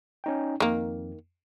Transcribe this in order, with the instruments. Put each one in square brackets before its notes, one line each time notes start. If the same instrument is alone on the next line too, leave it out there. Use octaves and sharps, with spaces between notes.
[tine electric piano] C#4 D#4 G5
[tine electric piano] F2 [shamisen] D#3 A#3